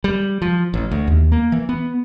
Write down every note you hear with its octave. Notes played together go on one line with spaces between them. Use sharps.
G3
F3
A1
D2
D#2
A#3
E3
B3